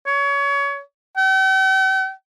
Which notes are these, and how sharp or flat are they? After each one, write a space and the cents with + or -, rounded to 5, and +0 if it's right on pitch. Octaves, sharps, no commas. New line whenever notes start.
C#5 +25
G5 -45